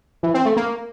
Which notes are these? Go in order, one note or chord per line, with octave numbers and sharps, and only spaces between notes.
E3
C4
A3
A#3